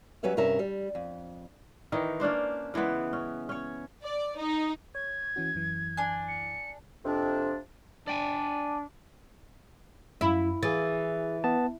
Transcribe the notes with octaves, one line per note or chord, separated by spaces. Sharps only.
F#3 G3 C#4 B4 C#5 E5
G2 C3 C#4 A#4 E5 A5
G3
F2
D#3 E3 D#4
A#3 C#4 D4 C5
C#3 E3 G#3 B3
C#4
C#4 C#5
D5
D#4
C#5 G#6
E3 C#4 F#4
F#2 E3
D4 G#5
C#7
F2 C3 D4
D4 D5 G5 G#5
F#2 E4
E3 G#4 A6
B3 A5